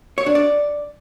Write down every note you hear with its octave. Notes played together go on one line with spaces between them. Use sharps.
C#5
D4
D5